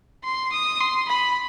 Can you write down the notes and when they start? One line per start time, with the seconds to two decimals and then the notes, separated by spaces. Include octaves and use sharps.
0.25 C6
0.52 D#6
0.80 C6
1.09 B5